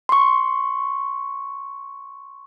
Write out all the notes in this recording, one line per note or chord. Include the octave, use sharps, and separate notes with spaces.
C6 C#6